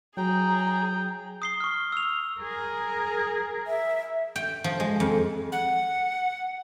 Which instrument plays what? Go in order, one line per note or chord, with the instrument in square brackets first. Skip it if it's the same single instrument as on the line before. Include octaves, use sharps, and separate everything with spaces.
[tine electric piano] F#3 [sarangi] G#4 [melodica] G5 [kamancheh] A#5
[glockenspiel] D#6 C7 G7
C#6 F6
E6 F7
[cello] G#4 A#4
[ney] E5
[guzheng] G5
F3
G#3
F2
[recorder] F#5